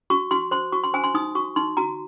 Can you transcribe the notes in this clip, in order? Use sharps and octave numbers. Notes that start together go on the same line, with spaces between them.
F#4 C#6
F#4 C6
C5 C6
F#4 C#6
C6
C5 G#5
C6
D#4 D#6
F#4 C#6
D#4 C6
F#4 A#5